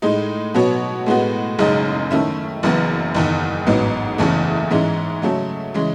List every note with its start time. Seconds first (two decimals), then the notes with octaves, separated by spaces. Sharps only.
0.02 A2 G#3 D#4
0.54 B2 F#3 B3 F#4 C#5
1.06 A2 G#3 B3 F#4
1.59 F#1 F#2 C#3 G#3 D#4
2.11 D#3 A3 C#4 E4
2.63 F#1 F#2 E3 B3
3.14 F#1 E2 D#3
3.66 A1 G#2 F#3 B3
4.18 F#1 E2 C#3 E3 A3
4.71 G#2 E3 G#3 C#4
5.22 C#3 F#3 A3
5.74 C#3 E3 G#3